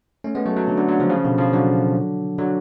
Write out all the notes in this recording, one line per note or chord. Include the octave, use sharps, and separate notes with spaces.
A3 C#4
G#3 B3
F#3 A3
F#3 A3
D3 F#3
D3 F#3
D3 F#3
C#3 F3
C#3 F3
B2 D3
C#3 F3
D3 F#3
D3 F#3